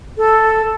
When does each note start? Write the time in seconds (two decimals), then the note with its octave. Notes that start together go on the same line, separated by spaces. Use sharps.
0.17 A4